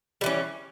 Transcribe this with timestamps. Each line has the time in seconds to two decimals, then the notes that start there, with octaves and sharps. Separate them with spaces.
0.21 G3
0.24 E3
0.26 C#4